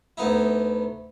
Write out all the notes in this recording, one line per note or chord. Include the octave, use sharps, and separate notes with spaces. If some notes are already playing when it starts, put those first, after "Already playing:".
D2 B3 D#4 E4